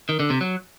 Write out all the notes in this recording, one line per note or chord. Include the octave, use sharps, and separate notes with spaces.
D#3
D3
C3
F#3